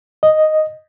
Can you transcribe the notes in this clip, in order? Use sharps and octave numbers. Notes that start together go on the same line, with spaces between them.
D#5